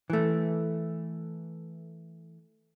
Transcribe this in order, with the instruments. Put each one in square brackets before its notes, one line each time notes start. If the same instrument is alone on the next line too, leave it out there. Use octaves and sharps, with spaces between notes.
[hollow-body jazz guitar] E3 A3